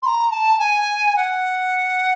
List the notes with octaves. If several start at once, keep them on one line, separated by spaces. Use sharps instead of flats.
C6
A#5
A5
G#5
F#5